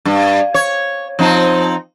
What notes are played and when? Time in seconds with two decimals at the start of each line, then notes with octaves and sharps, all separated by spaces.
0.05 G2
0.54 C#5
1.19 F3 C4 D#4